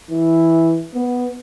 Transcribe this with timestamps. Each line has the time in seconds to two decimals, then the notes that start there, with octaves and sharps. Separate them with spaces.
0.11 E3
0.95 B3